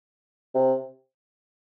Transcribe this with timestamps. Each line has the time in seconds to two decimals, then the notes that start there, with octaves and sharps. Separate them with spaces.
0.54 C3